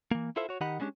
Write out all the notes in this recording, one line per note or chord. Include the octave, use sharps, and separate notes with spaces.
E3 A#3
E4 F4 A4 C5 E5
F#4 C#5
D#3 D#4 G4 D#5 F#5 B5
G3 G#3 C#4 D4 G4